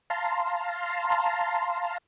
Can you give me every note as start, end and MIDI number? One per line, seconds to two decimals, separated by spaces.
0.10 1.98 77
0.10 1.98 81
0.10 1.98 82
0.10 1.98 84